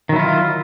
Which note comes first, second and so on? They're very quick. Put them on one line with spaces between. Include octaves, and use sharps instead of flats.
D#3 F#3 E4 F4